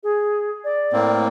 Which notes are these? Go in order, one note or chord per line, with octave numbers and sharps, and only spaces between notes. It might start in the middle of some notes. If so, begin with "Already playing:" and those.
G#4
D5
A2 A#3 C4